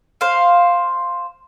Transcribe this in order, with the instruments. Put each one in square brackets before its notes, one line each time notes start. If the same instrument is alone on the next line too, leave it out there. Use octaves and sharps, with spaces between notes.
[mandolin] C5 F5